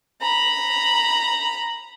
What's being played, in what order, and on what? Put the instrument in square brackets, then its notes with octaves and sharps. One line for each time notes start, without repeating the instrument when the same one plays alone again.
[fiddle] A#5 B5